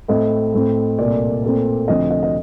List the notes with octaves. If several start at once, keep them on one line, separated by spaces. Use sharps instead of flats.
A2 A3 C4 D#5
A2 A3 C4
C2 A#2 A3 D5
A#2 A3 C4
D2 C3 F3 C4 D#5
D#5
D#5